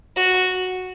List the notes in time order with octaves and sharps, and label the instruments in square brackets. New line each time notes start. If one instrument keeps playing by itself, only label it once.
[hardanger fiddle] F#4